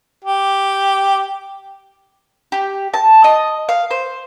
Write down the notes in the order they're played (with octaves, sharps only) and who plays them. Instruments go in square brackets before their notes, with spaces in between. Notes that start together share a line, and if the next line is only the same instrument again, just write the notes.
[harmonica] G4
[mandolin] G4
A5
D#5
F5
C5